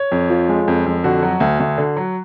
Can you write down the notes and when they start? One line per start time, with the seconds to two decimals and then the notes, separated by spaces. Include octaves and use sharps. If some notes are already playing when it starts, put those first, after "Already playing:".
Already playing: C#5
0.12 F2
0.30 F3
0.49 G#3
0.68 F2
0.86 F2
1.04 D3 F#4
1.23 F#3
1.40 D2
1.60 D2
1.78 D3
1.97 F#3